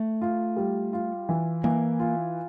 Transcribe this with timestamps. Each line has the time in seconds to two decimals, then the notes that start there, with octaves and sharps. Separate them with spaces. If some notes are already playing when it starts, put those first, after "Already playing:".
Already playing: A3
0.22 F4
0.57 G3
0.93 F4
1.29 E3
1.64 E3 A#3
1.99 F4